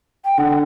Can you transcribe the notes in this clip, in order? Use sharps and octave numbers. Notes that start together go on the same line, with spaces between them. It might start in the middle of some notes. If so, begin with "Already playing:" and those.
G5
D3 F#5